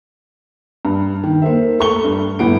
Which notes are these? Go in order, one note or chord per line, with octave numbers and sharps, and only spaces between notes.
G2
D#3
A#3 C5 E5
A3 C#6 G7
G2
G1 A2 B3 D7